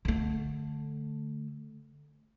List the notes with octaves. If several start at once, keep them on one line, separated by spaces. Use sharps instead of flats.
D3 A3